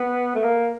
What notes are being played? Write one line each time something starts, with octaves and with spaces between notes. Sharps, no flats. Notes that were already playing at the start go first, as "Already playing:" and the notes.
Already playing: B3
A3
A#3